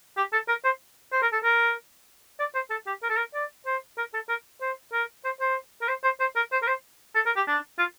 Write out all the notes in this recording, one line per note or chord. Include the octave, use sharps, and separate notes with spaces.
G4
A4
A#4
C5
C5
A#4
A4
A#4
D5
C5
A4
G4
A#4
A4
A#4
D5
C5
A#4
A4
A#4
C5
A#4
C5
C5
A#4
C5
C5
C5
A#4
C5
A#4
C5
A4
A#4
G4
D4
F4